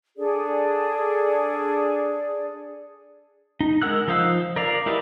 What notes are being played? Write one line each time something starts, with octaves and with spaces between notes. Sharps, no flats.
D4 G#4 A4 D5
D#4
G#3 A#4 F#5 E6 F#6
F3 D#4 C5 F5 E6
A#4 D5 F5 A#5
E4 G4 A#4 B4 D#5